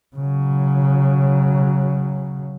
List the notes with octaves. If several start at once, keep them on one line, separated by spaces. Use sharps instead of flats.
C#3 F#3